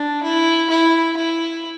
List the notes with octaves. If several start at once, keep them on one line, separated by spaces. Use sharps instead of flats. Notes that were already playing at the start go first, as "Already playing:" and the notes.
Already playing: D4
E4
E4
E4